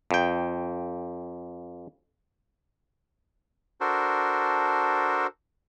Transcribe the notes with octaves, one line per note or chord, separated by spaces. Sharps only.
F2 G5
D4 F#4 A4 A#4 C5